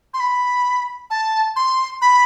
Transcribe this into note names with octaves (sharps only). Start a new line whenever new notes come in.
C6
B5
A5
C6
B5